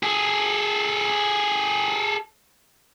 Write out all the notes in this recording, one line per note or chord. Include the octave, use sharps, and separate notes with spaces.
G#4 A4